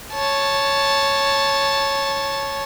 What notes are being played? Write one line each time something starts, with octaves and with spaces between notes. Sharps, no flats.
C#5 A5